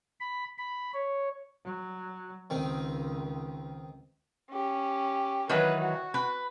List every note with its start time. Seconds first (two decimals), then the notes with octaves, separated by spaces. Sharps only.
0.20 B5
0.58 B5
0.94 C#5
1.65 F#3
2.50 C#2 D#3 C4
4.51 C#4 G4
5.50 D#3 E3 F#3 B4
5.80 F#4
6.14 B4